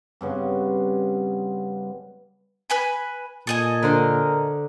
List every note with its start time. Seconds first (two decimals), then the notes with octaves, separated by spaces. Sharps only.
0.21 G2 C#3 B3 C4
2.70 B4 G#5 B5
3.47 A#2 A4 D#5 G#5
3.83 D3 A#4 C5